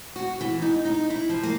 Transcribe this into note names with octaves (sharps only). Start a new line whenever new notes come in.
F#4
E3
D#4
D#4
E4
F3
A#3